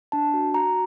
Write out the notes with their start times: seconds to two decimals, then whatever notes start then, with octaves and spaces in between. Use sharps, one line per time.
0.12 D4 A5
0.34 F#4
0.54 F#4 A#5